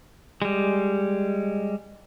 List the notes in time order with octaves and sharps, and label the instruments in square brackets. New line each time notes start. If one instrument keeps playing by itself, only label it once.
[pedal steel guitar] G3 G#3